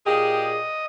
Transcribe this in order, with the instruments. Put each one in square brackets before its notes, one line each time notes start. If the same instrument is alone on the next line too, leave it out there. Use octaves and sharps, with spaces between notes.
[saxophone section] A#2 G4 G#4 [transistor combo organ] D#5